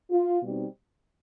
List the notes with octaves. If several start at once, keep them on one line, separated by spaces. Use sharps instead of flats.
F4
B2 G3 C4 D#4